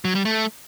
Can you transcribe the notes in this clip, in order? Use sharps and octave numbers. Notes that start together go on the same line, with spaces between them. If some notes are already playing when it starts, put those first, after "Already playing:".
F#3
G3
A3